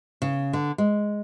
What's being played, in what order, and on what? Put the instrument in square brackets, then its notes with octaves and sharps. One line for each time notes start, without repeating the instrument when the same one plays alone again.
[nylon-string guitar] C#3
D3
G#3